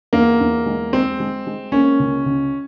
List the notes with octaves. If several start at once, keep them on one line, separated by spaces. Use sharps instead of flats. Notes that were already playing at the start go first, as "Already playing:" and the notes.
E2 A#3
E2
G#3
G#3 C4
G#3
G#3
A#3 C#4
C#2
C#2